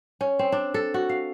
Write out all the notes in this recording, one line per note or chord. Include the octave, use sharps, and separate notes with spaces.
C#4
C4
D4
A4
F#4
F5